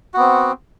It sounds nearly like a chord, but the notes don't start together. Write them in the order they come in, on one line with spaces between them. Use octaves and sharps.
F#4 B3 C4